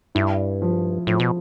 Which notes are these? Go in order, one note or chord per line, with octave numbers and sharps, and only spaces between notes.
G2 E4
F3
A2 F3
B2